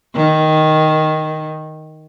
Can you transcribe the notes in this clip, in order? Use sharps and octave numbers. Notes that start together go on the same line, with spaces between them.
D#3